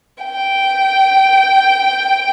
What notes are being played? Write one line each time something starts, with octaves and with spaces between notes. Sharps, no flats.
G5